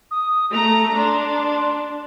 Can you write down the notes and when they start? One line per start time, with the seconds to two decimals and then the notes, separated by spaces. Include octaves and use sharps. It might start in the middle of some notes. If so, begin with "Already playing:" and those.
0.11 D#6
0.53 A3 A#5 F7
0.97 D4 C6